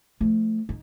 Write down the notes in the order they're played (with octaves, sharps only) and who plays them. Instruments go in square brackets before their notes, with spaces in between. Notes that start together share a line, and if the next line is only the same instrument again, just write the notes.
[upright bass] F3 A3
D#4